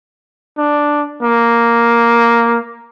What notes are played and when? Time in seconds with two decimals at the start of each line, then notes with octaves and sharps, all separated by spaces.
0.58 D4
1.22 A#3